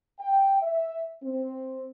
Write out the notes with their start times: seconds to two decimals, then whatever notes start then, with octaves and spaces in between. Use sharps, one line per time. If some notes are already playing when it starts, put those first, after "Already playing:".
0.20 G5
0.62 E5
1.23 C4